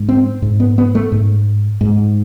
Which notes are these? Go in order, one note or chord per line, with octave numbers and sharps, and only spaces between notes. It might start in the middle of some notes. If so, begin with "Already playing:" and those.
Already playing: G#2
C4
G#2
B3
B3
A3
G#2
G#2